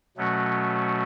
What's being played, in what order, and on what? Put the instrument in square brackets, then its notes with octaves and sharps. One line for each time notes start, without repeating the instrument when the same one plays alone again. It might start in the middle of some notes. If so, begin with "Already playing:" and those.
[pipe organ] B2 F#3 A3 C#4 F#4